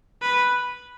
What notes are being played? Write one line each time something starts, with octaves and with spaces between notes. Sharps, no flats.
B4